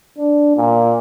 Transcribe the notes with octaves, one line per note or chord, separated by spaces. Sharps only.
D4
A#2